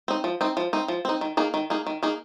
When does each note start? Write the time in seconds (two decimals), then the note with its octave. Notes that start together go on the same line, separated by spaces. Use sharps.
0.08 C4 D#4
0.24 F3
0.41 C4 D#4
0.57 F3
0.73 C4 D#4
0.88 F3
1.05 C4 D#4
1.21 D#3
1.37 A#3 D#4 G#4
1.54 D#3
1.70 A#3 D#4 G#4
1.87 D#3
2.03 A#3 D#4 G#4